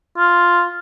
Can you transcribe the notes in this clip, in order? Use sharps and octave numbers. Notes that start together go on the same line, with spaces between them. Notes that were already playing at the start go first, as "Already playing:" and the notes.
F4